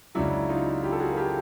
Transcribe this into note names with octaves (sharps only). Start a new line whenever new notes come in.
C#2 C#3 F#3 D4 E4
D#4 F4
F4 G4
A4
F#4 G#4
A#4
G4 A4